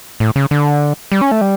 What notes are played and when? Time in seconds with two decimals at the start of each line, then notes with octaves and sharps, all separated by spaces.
0.20 A2
0.36 C#3
0.51 D3
1.12 G3
1.21 C#4
1.31 A3
1.41 G3